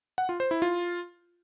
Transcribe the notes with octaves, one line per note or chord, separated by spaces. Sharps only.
F#5
F4
C5
E4
F4